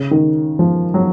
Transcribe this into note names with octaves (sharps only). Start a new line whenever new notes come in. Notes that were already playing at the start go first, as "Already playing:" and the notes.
Already playing: C#3
D#3
F3
F#3